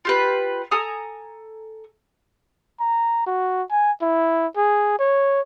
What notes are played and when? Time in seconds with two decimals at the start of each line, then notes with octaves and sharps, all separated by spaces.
0.05 F4 G4 B4
0.71 A4 G#5 A#5 D#6
2.80 A#5
3.26 F#4
3.71 G#5
4.02 E4
4.56 G#4
4.99 C#5